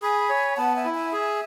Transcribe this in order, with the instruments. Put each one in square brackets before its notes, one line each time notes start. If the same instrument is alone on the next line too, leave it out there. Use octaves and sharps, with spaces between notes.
[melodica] G#4 [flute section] G#5 B5
[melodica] C#5
[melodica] B3 [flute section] F#5 A5
[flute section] E5 G#5
[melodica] E4
[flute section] E5 G#5
[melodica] G#4